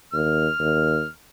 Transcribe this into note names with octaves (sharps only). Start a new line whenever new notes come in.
D#2 F6
D#2